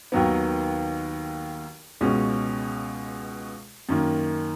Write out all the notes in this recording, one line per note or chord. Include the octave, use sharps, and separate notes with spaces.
D#2 D#3 F#3 B3
C#2 B2 G#3 C#4
F#2 D#3 A#3